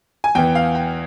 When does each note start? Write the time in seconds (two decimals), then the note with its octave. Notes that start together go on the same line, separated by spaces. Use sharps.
0.24 G#5
0.35 E2 E3 G5
0.55 F5
0.75 G5